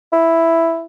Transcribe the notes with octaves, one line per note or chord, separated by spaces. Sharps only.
E4